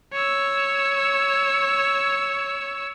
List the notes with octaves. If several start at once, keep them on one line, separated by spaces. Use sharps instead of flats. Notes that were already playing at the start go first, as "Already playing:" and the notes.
C#5 E6